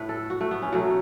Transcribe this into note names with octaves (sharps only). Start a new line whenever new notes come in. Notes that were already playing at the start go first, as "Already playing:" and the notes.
Already playing: A2 A3 B4
A4
F#4
A3
B3
C#4
B2 F#3 A3 F#4